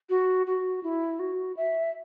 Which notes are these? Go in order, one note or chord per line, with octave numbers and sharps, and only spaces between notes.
F#4
F#4
E4
F#4
E5